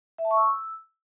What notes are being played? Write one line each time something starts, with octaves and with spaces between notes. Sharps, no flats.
E5
A5
C#6
E6